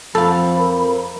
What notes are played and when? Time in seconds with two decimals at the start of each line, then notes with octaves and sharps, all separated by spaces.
0.15 F2 F3 A4 F5 B5
0.58 A#4